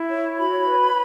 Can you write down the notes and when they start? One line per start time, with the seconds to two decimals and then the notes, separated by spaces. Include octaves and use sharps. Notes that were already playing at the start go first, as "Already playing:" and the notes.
Already playing: E4
0.08 C#5
0.36 F#4 B5
0.65 B4